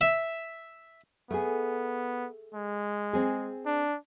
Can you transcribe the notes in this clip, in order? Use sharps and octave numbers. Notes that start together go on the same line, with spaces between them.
E5
A3 B3 G#4
G#3
C4 G#4
D4